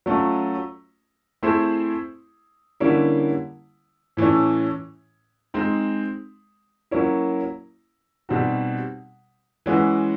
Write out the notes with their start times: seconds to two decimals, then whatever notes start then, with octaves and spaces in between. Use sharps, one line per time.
0.06 F#3 A3 C#4 F4
1.43 A3 C4 E4 G#4 C5
2.80 D3 G3 A#3 C#4 E4
4.17 A2 E3 A3 C#4
5.54 G#3 C4 D#4
6.91 F#3 A#3 C#4 E4
8.29 B2 G3 C4 D#4 F#4
9.66 E3 G#3 C#4 F#4 B4